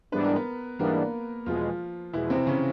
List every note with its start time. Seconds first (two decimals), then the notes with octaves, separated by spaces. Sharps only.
0.12 G#2 E3 G3 B3 D4 B4
0.24 A#4
0.36 B3 B4
0.79 G#2 E3 G3 A#3 B3 D4 A#4
1.46 E2 B2 F3 G#3 F4
2.13 E2 B2 E3 G#3 E4
2.30 C3 C4
2.47 C#3 C#4